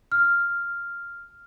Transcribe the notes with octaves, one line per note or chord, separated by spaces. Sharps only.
F6